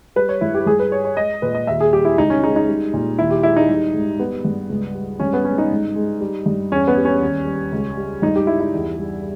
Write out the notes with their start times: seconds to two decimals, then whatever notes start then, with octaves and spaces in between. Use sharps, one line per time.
0.16 G3 B4
0.29 C#5
0.41 G2 E4
0.54 G4
0.66 G2 G#4
0.79 B4
0.91 G3 C#5
1.05 C#5
1.17 G#3 D#5
1.42 A#2 B4
1.55 D#5
1.67 D#2 E5
1.80 G#4
1.92 G3 G4
2.05 E4
2.18 C#2 D#4
2.30 C#4
2.43 G#3 D#4
2.56 D#4
2.68 G3
2.93 A#2
3.18 D#2 E4
3.31 G4
3.43 G#3 E4
3.56 D#4
3.68 G3
3.94 G#2
4.19 G3 B3
4.45 G2
4.69 C#2
4.95 G3
5.19 G2 C#4
5.33 B3
5.45 G#3 C#4
5.58 D#4
5.70 G#2
5.95 G#3
6.21 G3
6.46 G2
6.72 E2 C#4
6.87 B3
6.97 G3
7.05 C#4
7.21 D#2
7.46 G3
7.72 C#2
7.97 G3
8.22 G2 D#4
8.36 G4
8.47 G3 E4
8.60 E4
8.73 E2
8.99 G3